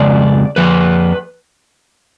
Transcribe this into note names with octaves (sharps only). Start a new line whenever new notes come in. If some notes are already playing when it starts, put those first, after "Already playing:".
Already playing: F2 C#3 G#3 D5
F2 F3 B4